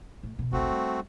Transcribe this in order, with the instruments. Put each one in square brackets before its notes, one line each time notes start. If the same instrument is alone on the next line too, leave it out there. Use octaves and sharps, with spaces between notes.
[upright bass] A2
B2 D#3
[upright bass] G1 C#2 [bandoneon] A3 C4 F#4
[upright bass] G3